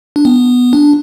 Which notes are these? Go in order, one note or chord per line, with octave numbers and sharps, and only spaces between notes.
D4
B3
D4